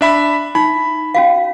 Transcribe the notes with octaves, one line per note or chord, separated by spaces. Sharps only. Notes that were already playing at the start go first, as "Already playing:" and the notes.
D4 E5 B5
D#4 B5
C#4 F#4 F5